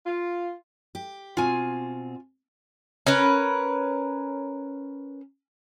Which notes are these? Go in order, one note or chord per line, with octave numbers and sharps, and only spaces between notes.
F4
G4
B2 C4 F4 G#5
C#4 A#4 B4